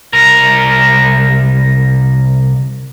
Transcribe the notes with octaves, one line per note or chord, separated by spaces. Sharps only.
C2 A#4